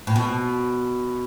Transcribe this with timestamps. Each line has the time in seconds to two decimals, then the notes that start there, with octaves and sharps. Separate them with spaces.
0.07 A2
0.16 B2